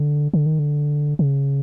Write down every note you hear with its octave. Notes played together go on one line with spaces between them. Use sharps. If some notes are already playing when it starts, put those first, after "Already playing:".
Already playing: D3
D3
D#3
D3
C#3